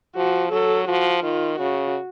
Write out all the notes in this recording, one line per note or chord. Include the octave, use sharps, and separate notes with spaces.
F3 F#4
F#3 A4
F3 F#4
D#3 F4
C#3 F#4